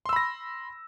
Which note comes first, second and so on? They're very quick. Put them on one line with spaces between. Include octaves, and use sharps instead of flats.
C6 E6 B5 A#6